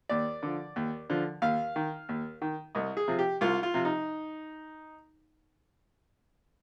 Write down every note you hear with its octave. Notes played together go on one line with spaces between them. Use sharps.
D#2 D5
D3 F3
D#2
D3 F3
D#2 F5
D#3
D#2
D#3
C2 D#5
G#4
C3 F3
G4
C2 F4
F4
C3 F3
D#4